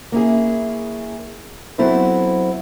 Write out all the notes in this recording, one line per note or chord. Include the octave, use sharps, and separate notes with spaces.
A#3 C#4 E4 G#4
F#3 B3 C4 E4 A4 C5